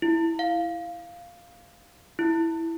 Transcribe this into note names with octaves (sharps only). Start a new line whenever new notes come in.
E4
F5
E4